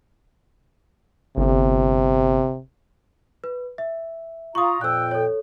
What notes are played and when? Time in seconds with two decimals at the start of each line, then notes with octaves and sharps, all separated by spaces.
1.37 G1 C3
3.44 B4
3.78 E5
4.55 F4 A#5 C#6 D#6
4.81 F2 A#2 G5 E6 F#6
5.11 A4 C#5